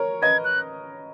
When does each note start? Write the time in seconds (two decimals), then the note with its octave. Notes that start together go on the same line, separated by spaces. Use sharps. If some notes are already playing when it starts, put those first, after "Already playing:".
Already playing: A#4 C#5
0.22 B4 D#5 G#6
0.44 F#6